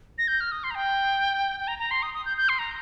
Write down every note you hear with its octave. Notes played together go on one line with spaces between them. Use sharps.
A#6
G6
F6
D#6
C6
A#5
G5
G5
A#5
A#5
C6
D#6
D#6
G6
G6
C6
A#5